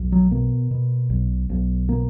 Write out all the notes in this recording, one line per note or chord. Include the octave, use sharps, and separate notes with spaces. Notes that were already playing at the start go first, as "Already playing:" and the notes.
Already playing: B1
F#3
B2 A#3
B2
B1
B1
B2 A#3